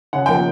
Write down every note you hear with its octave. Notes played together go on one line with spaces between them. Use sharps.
C#3 F#5
F3 A#3 G5